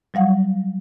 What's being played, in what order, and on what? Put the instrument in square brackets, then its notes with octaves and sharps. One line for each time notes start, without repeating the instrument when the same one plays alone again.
[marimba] F#3 G3 F5 F#5